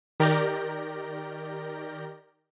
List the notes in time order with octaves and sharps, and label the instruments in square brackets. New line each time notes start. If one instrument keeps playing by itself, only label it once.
[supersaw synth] D#3 G4 A#4 D5 G6 A#6